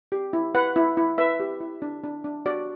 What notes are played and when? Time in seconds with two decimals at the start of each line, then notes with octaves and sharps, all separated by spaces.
0.12 G4
0.33 E4
0.55 B4 F#5
0.76 E4
0.97 E4
1.18 B4 E5
1.40 G4
1.61 E4
1.82 D4
2.04 D4
2.24 D4
2.46 F#4 D5